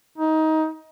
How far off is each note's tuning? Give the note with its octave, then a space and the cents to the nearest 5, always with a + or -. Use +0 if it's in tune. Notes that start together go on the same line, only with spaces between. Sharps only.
D#4 +20